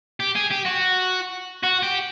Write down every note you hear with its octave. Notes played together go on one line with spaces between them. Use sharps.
G4
G#4
G4
F#4
F#4
G4